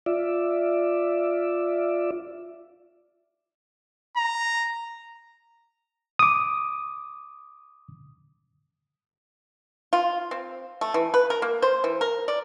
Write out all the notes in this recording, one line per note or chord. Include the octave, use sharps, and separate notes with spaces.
F4 D5 E5
A#5
D6 D#6
F4
C4
A3
E3
B4
A#4
A#3
C5
E3
A#4
D5